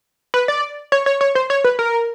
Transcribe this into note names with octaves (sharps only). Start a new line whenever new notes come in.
B4
D5
C#5
C#5
C#5
C5
C#5
B4
A#4